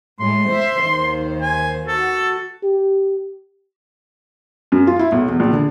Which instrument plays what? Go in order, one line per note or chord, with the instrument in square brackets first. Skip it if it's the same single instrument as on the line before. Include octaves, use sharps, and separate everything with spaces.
[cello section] A2 G#3 [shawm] C6
[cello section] C5 E5
D#2 D#3 C5
[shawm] G#5
[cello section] F#4 [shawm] A4
[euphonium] G4
[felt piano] F#2
F4
E4
B1
E2
A#1
D3